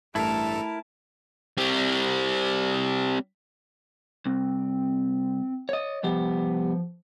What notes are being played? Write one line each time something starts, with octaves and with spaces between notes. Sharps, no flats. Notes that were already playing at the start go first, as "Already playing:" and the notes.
A1 G2 A3 E4 A4 A#4 A5
G3 C4
C2 C4
C#5 D#5
C2 F3 B3 G4